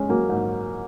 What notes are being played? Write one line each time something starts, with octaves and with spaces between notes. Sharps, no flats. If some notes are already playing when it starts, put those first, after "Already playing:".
Already playing: G#3 C#4
F#3 A#3
G#2